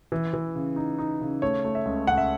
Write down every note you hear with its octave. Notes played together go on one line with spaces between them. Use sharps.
E3
E3
C#3
D#4
D#4
C#3
A3 C#5
A3
E5
C#2
C#2 F#5
E5